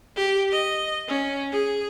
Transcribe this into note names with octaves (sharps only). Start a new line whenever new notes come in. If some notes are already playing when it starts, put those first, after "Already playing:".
G4
D#5
C#4
G#4